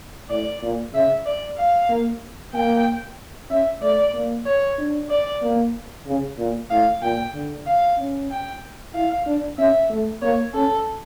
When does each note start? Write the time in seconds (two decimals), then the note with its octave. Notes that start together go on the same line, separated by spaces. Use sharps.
0.29 A2 D5
0.62 A#2
0.94 C#3 E5
1.26 D5
1.58 F5
1.89 A#3
2.53 A#3 G5
3.50 C#4 E5
3.82 A3 D5
4.14 A#3
4.46 C#5
4.78 D4
5.10 D5
5.42 A#3
6.07 C#3
6.38 A#2
6.70 A2 F5
7.02 A#2 G5
7.34 D3
7.66 F5
7.98 C#4
8.31 G5
8.94 E4 F5
9.26 D4
9.58 C#4 E5
9.90 A3
10.22 A#3 C#5
10.54 C#4 A4